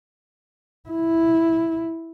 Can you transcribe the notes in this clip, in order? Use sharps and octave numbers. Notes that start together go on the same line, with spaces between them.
E4